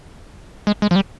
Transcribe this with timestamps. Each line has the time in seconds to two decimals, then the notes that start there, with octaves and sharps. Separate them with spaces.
0.67 G#3
0.82 G#3
0.91 F3
0.96 G3